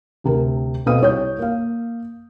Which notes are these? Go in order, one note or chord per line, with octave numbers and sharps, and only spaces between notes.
D2 C3 A#4
B2 C4 A4 F5 D#6 D#7
C2 C#5 G6
A#3 F5